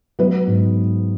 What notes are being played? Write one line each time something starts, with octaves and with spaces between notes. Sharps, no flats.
F#3 B3 B4
G#2